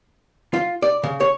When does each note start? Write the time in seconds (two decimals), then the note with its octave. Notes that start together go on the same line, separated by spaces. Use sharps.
0.54 F4
0.82 D5
1.03 C#3
1.20 C#5